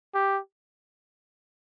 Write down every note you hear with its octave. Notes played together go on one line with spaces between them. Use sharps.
G4